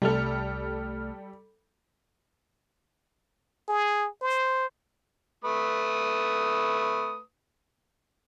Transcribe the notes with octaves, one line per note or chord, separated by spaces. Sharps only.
C2 G3 A3 A4 F6
G#4
C5
A3 B4 D#6